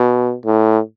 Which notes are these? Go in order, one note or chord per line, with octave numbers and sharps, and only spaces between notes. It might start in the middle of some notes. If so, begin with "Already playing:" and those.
Already playing: B2
A2